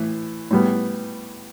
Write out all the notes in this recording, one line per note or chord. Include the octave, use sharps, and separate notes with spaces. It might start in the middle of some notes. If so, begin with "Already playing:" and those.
Already playing: A2 E3
A2 G3 B3